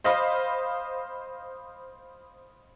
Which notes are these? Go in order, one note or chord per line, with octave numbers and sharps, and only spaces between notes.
C5 D#5 F5 B5